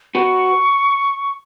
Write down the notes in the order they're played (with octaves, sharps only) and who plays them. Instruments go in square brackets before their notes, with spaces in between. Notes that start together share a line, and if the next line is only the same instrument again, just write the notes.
[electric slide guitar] F#4 B4 [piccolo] C#6